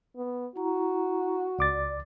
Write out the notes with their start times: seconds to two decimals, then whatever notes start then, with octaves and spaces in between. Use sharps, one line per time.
0.17 B3
0.56 E4 F#4 A#5
1.59 C#2 D5 D6 A6